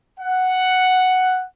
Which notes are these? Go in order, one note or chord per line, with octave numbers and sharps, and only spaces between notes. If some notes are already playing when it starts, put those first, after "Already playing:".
F#5